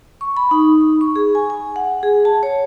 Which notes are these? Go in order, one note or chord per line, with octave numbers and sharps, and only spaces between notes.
C#6
B5
D#4
C#6
G#4
G#5
G#5
F#5
G#4
A5
C#5